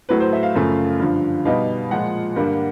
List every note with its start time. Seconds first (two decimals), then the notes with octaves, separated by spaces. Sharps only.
0.09 A2 F#3 A3 B4
0.20 C5
0.33 E5
0.43 F5
0.55 F#2 C#3 F3 A3
0.99 G2 D3 F3
1.45 B2 G3 B3 D#4 F5
1.91 A#2 F3 G#3 F#5
2.36 G2 D3 G3 A#3